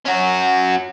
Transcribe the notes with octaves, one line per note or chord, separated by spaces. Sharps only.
C#4 F#4